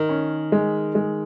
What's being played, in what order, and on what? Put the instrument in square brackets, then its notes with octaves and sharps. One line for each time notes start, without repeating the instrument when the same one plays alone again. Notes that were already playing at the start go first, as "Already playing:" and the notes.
Already playing: [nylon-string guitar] D#3
[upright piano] C#4
G#3
G#3